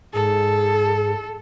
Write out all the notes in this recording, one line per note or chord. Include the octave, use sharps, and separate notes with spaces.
G#2 G#4 A4